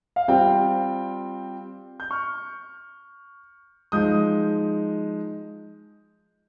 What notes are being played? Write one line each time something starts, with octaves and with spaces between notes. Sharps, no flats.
F5
G3 C4 F4 G5
G6
C#6 F6
F3 G#3 D#4 D#6 G6